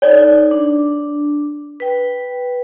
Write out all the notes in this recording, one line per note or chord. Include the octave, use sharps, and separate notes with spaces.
D#4 A4 C#5 D5
D4
B4 G5